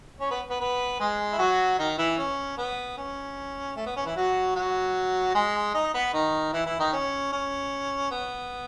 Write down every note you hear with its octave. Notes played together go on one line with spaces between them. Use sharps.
C#4 C#5
B3 B4
B3 B4
B3 B4
G#3 G#4
E4
F#3 F#4
D#3 D#4
E3 E4
C#4
B3
C#4
A3
B3
C#4
E3 E4
F#3 F#4
F#3 F#4
G#3 G#4
D#4 D#5
B3 B4
D#3 D#4
E3 E4
E3 E4
D#3 D#4
C#4
C#4
B3